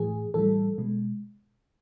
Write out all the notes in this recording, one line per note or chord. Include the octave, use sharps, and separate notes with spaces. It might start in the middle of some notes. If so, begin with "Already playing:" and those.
Already playing: A2 E3 G#4
A2 E3 G3 A4
B2 G#3